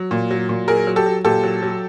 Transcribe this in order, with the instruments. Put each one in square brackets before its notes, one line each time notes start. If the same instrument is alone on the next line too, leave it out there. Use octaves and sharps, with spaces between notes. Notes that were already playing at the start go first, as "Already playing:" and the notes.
Already playing: [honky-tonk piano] F#3
A#2
F#3
A#2
F#3 G#4 A#4
F#3
G4 A4
F#3
A#2 G4 A4
F#3
F#3